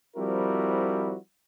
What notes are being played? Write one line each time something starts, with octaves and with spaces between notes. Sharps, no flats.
F3 G3 C4 E4 F#4 A#4